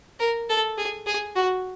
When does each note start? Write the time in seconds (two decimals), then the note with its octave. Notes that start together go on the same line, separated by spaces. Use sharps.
0.20 A#4
0.50 A4
0.78 G#4
1.07 G#4
1.35 F#4